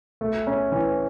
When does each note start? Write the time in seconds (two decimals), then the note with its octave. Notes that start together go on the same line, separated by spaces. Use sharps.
0.21 A3
0.47 C#4
0.72 E3